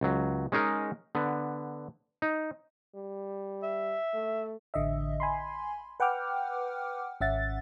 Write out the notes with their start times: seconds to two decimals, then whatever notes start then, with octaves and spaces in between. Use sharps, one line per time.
0.01 C#2 F#3
0.52 G#3 C#4 D#4 G#4 A#4 D#5
1.15 D3 B3
2.22 D#4
2.95 G3
3.63 E5
4.13 A3
4.74 A1 D3 D#5 E5
5.20 G#5 B5 C6
6.00 B4 F#5 G5 D6 F6
7.21 G#1 C#4 E5 F#5 A6